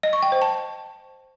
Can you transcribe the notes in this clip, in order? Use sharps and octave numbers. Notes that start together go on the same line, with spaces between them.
D#5
C#6
G5
C5
A5